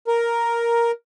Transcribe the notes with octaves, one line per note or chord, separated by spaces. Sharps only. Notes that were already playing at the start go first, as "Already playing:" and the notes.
A#4